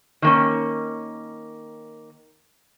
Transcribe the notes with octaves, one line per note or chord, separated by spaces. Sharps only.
D#3 A#3 C#4